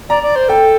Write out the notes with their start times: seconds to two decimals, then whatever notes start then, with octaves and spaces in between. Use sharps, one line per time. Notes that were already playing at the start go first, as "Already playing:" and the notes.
0.09 D5 A#5
0.23 D5
0.36 C5
0.49 A4 G5